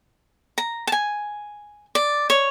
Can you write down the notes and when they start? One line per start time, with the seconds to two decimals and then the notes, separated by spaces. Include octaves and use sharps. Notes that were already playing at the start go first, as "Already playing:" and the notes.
0.58 A#5
0.87 A5
0.92 G#5
1.95 D5
2.30 C#5